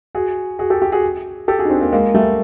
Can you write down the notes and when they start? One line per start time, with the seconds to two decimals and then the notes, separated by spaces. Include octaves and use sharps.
0.15 F#4 G#4
0.59 F#4 G#4
0.70 G4 A4
0.82 G4
0.92 F#4 G#4
1.48 G4 A4
1.59 F#4 G#4
1.65 D#4
1.70 C4 D4
1.81 A#3 C4
1.92 G#3 A#3
2.14 G3 A3